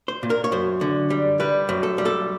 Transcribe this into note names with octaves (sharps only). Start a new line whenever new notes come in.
C5
A#2
A#4
C#5
F#2 C5
D3
G3
G3 B4
F#2
A4
G3
A4